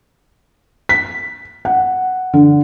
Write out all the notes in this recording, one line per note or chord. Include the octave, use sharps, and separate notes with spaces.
B6
F#5
D3